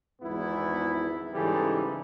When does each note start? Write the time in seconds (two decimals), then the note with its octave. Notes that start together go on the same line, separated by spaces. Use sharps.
0.21 G#1 E2 G#2 B3 E4
1.33 G#2 C#3 E3 G3 A4